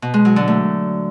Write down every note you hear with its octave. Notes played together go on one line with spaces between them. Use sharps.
B2
G#3
F#3
D3
A3